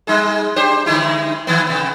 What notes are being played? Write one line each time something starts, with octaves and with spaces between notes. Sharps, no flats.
G3 D#4 G#4
D4 G4 C5
D3 G#3 E4
D#3 E3 B3
C3 B3